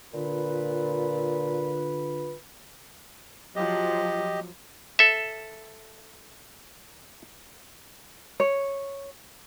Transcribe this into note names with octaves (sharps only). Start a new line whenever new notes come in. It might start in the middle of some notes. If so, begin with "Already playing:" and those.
A#2 D3 F4 B4
F3 F#3 G4 D#5
A4 E5
C#5